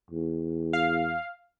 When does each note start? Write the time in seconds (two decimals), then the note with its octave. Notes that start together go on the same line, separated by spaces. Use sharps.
0.11 E2
0.73 F5